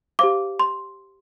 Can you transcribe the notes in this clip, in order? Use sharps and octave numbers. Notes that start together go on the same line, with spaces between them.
G4 C5 F5 D6
C6